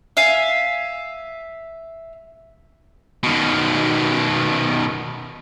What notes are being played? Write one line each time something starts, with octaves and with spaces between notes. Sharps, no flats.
E5 F5 G#5
B2 D#3